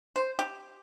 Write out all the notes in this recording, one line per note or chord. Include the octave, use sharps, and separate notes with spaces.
C5
G4